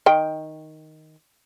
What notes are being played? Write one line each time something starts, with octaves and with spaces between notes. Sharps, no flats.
D#3 G5